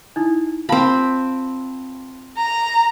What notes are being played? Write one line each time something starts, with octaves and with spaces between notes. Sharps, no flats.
D#4 E4
C4 F4 F5 A5 B5
A#5